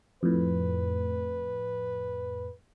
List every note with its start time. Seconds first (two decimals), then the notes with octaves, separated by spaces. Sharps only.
0.23 F2 A2 B4